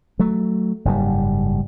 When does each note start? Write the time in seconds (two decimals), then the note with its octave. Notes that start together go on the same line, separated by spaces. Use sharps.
0.19 F#3 A3
0.85 F#1 G#2 C#3 G3